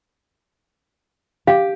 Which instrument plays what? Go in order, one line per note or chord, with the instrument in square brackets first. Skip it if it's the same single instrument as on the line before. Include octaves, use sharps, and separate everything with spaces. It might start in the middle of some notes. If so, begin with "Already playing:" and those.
[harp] G4 [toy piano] F5